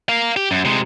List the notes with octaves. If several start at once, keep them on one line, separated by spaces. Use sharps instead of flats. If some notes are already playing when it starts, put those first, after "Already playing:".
A#4 F5
G4
F#2
C3 G#3